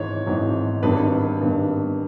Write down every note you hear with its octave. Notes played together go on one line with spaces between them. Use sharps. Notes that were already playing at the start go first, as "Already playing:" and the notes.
Already playing: G#1 G#2 E3 C#5
G#1 G#2 E3
G#1 G2 D#3 B4
G#1 G2 D#3